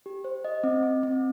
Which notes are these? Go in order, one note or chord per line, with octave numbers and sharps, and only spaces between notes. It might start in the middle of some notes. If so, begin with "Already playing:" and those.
G4
C5
D#5
C4
C4
C4